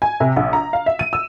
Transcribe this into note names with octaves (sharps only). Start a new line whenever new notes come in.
G#5
C3
A#1
A#5
F5
E5
D#7
E6